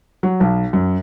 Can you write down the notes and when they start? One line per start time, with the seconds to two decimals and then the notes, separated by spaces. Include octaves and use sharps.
0.23 F#3
0.40 B1
0.73 F#2